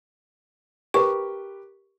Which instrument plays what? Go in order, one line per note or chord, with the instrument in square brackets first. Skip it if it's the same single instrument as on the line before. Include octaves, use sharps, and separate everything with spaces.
[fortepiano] G4 A#4 B4 [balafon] C#6